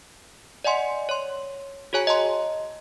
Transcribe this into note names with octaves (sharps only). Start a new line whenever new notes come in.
D5 D#5 F#5 G#5 C6
C#5 C6
F#4 G#4 C#5 G#5 A#5
D#5 A5 A#5 C6